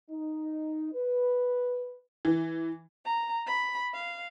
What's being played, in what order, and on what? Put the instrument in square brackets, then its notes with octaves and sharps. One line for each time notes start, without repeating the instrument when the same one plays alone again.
[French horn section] D#4
B4
[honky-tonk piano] E3
[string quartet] A#5
B5
F5